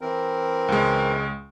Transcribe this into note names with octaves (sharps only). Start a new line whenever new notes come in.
E3 C4 A#4
C#2 G#3